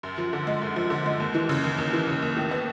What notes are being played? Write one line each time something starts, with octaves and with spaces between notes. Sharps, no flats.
F#2
F3
D3
G#3
F#2
F3
D3
G#3
D#2
E3
C#3
D#2
D#2
E3
C#3
D#2
A2
B3